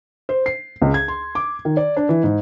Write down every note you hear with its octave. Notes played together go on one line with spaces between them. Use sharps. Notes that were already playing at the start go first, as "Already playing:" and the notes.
C5
C7
C#2
G#6
C6
D6
D#3
D5
D4
E3
G#2